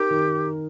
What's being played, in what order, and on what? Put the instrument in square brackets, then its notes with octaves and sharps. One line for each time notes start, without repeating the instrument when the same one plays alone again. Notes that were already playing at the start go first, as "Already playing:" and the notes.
Already playing: [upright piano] D#4 A#4 [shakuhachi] G4
[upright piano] D#3